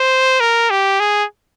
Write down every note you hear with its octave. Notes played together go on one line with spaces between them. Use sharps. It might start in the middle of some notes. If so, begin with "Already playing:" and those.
Already playing: C5
A#4
G4
G#4